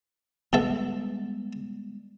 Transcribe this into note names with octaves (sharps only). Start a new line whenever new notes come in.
B2 G3 G#3 B3 A4 E5